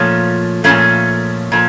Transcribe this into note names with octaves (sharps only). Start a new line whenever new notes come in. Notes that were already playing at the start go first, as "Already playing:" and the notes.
Already playing: A#2 F3 A3 C#4
A#2 F3 A3 C#4
A#2 F3